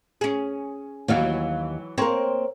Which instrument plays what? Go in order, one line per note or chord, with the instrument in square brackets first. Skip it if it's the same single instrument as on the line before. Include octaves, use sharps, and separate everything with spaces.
[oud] C#4 G#4
[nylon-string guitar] D#2 F5 [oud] E3 F#3
[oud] A#3 C4 [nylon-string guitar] A#4 C#5